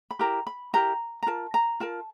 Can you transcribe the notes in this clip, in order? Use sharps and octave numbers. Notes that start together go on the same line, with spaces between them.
B5
E4 G4 A#4 A#5
B5
E4 G4 A#4 A#5
A#5
F4 A#4 A5
A#5
F4 A#4 A5